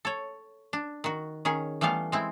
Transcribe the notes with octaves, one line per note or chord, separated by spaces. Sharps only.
A4 C#5
D4
D#3 F#4
D#3 C#4 G#4
E3 G3 A3 B3 F5
G#3 C4 E4